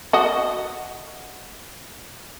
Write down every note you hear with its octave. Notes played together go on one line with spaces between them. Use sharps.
F#4 D#5